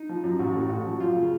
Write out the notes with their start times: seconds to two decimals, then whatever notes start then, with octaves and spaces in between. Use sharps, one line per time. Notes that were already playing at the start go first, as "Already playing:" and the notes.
Already playing: D#4
0.09 F3
0.24 F#2
0.39 A1 F#4
0.55 A2
0.69 A1 F#4
0.86 F3
1.00 F#2 F4
1.16 C#3